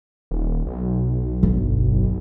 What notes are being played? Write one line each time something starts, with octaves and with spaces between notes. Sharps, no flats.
D#1
B1
G1